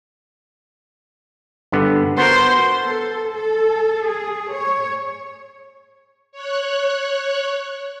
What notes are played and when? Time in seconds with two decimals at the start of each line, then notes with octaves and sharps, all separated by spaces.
1.72 G2 D3 B3
2.18 B3 F#4 A#4 C5
2.81 A4
3.33 A4
4.04 G#4
4.52 C#5
6.32 C#5 F#6